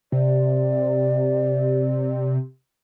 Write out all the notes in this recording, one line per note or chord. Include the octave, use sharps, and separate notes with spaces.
C3 D5